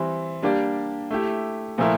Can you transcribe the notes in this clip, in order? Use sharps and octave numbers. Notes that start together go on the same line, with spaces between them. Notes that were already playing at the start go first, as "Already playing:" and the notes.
Already playing: E3 G3 C4
G3 A#3 D4 G4 D5
A3 E4 G4
A#2 F3 A3 E4 A#4